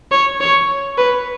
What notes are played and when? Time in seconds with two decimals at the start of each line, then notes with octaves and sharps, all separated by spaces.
0.11 C#5
0.40 C#5
0.98 B4